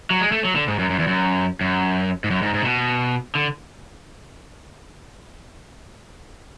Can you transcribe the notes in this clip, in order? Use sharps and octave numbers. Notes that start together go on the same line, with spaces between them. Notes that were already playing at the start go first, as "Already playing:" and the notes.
F#3
G#3
A3
F#3
D3
G#2
F#2
F#2
E2
F#2
F#2
G#2
F#2
G#2
G#2
C#3
B2
D3